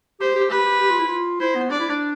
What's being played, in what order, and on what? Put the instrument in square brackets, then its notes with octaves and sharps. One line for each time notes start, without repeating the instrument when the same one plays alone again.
[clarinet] G4 [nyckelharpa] C5
[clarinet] G4
[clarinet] G4 [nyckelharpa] B4
[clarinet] G4
G4
F4
E4
F4
[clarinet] E4 [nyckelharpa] C5
[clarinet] B3
[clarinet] D4 [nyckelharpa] D5
[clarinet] E4
D4